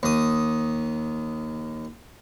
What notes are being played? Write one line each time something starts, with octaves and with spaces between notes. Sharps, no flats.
D#2 D#6